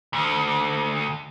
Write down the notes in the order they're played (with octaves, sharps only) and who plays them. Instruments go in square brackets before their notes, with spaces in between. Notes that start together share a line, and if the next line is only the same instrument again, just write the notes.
[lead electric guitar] D2